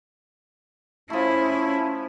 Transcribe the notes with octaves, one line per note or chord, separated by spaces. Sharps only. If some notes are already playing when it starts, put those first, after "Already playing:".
F3 A3 C#4 E4